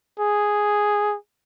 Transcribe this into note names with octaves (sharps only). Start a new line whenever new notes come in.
G#4